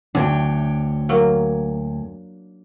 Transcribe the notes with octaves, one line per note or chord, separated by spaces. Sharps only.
D2 D4 C#5 G5
F#3 A#3